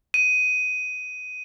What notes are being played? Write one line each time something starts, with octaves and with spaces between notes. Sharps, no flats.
D#7